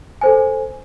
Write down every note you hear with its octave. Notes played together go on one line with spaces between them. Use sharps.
A4 C5 G#5